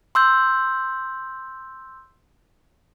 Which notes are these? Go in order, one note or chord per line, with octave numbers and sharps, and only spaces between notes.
C6 E6 G6